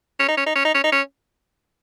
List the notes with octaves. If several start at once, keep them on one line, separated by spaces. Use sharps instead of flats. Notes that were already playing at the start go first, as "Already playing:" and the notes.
C#4
D#4
C#4
D#4
C#4
D#4
C#4
D#4
C#4